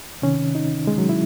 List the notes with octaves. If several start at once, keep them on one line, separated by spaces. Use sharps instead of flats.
C3 D#3 C#4
D#4
G#3
F#3
E4